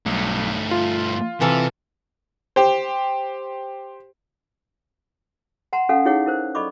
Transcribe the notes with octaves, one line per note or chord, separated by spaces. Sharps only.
B1 G2 A3
F4
C3 E3 A4 F5
G4 C5
F#5 A5 A#5 C6
C#4 A4 F5 F#5 G#5
D#4 E4 G#4 C#5 F5 F#5
E4 A#4 C5
A4 D5 D#5 B5 C#6 D6